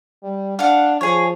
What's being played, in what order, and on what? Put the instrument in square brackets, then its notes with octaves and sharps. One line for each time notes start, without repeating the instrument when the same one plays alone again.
[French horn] G3
[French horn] D4 [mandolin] F5 F#5
[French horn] F3 [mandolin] G#4 C#5